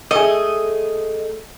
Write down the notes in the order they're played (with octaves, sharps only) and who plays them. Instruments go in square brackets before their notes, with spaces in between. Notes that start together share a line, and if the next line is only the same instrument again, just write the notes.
[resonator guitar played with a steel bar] A3 G#4 [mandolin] D#5